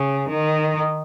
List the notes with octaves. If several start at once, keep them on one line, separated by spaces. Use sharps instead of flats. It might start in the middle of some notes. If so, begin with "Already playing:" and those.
Already playing: C#3
D#3